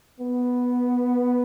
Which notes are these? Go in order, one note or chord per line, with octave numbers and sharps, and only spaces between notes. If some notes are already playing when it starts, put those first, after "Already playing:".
B3